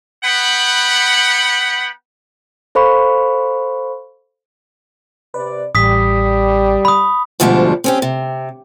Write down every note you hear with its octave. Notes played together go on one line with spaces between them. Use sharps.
B3 F#5 G5 B5
A4 C5 F5 B5 C#6
C3 B4 D5
A1 G3 D#6 B6
B5 D#6
D2 G#2 B2 F3 G3 D4
C4 C#4 G4
C3